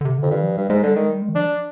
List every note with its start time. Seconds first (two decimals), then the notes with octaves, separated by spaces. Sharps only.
0.01 D3
0.05 C3
0.18 F2 D3
0.31 G2 D#3
0.44 F3
0.57 G2 G3
0.70 G#2 G#3
0.83 D3 G3
0.96 D#3 G#3
1.09 G3
1.22 G#3
1.29 D#3
1.34 F3 D4